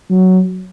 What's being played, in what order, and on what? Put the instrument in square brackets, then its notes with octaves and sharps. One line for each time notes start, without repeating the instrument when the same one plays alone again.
[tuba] F#3